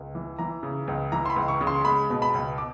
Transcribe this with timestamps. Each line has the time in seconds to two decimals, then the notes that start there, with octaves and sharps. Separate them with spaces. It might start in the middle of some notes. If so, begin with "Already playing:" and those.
Already playing: C#2
0.15 E3
0.39 E3 A#5
0.63 C#3
0.88 C#2
1.12 E3 A#5
1.26 C6
1.30 B5
1.36 C#2
1.48 C#6
1.61 C#3
1.67 C6
1.85 G#3 B5
2.10 B2
2.22 B5
2.34 C#2
2.58 D6